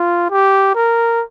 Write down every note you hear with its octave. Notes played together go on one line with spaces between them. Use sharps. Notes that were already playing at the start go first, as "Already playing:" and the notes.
Already playing: F4
G4
A#4